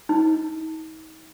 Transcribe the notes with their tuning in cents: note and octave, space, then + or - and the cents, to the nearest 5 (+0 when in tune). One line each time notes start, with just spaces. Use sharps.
D#4 +35